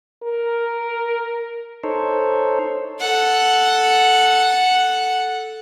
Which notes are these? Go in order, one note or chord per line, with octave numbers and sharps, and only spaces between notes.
A#4
D#4 A4 C5 C#5
A4 F#5